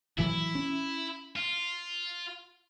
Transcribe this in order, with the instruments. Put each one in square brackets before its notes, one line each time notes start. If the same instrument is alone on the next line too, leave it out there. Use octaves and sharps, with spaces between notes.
[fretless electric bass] A2 E3 F#3 [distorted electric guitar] E4
[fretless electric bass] C#4
[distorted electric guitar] F4